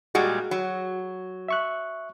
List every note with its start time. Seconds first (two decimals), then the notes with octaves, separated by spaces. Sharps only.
0.15 A#2 G3 G#3 F#4 G#4
0.51 F#3
1.48 E5 C#6 F#6